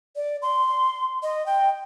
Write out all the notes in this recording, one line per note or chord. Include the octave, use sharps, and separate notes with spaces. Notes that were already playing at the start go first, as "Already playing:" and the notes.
D5
C6
D#5
G5